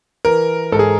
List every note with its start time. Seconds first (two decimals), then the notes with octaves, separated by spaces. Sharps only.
0.25 E3 A#4
0.72 G#2 A4
0.79 G#4